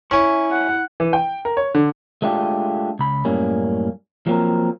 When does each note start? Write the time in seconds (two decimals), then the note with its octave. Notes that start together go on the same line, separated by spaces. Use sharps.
0.11 C#4 E4 C#5 E5 G#5 C#6
0.52 F#5
1.00 E3
1.13 G5
1.45 A#4
1.57 C#5
1.75 D3
2.22 G#3 A3 D4 F4 G4
2.99 C#2 B5
3.25 F#2 A2 G3 A#3 C#4
4.27 F3 F#3 A#3 C4 A#4